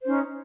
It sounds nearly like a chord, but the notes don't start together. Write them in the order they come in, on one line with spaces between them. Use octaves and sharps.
C5 C#4 D#4